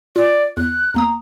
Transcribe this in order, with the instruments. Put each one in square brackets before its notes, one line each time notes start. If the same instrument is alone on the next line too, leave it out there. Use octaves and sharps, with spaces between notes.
[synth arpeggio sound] F4 [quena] D5
[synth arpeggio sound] E2 [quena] F#6
[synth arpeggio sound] E2 A#3 D#6 [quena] A#5